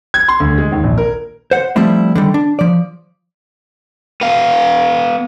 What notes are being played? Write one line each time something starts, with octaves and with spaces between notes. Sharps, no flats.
G#6
C6
D2
G#3
D#2
A#1
A#4
C5 F#5
F3 G3 A3 C4 E4
D3 D#3 G3
D4
F3 D5
B3 F5